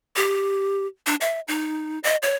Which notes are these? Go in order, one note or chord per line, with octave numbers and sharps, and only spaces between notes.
G4
D4
E5
D#4
D#5
C#5